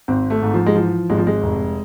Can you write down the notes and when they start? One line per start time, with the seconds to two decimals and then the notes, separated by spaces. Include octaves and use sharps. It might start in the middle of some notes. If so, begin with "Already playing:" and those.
0.08 G#1 C4
0.30 A3
0.42 G#2
0.54 F3
0.66 G#3
0.75 E3 F3
1.10 G#1 G#3
1.17 F3
1.27 G#3
1.42 F1